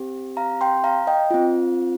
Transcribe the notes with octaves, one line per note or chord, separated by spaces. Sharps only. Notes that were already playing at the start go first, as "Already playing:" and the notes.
Already playing: C4 G4
F5 A#5
G5 C6
F5 A#5
D#5 G5
C4 F4